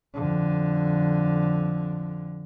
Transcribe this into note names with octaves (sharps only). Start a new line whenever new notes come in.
F2 D3